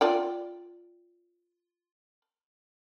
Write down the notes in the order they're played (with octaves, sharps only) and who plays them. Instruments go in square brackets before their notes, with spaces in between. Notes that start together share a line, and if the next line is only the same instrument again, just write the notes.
[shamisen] F4 D5 G5